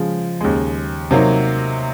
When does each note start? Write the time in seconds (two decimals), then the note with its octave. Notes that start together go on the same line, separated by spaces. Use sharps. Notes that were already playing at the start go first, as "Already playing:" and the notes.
Already playing: C#3 F3 G#3
0.41 D#2 C#3 G#3
1.11 C3 F#3 A#3 D#4